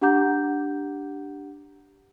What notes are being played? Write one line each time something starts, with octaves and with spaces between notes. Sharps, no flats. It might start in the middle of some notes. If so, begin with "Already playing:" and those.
D4 G4 F#5 A#5 D6 G6